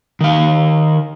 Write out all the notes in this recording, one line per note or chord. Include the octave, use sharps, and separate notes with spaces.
D#3 F5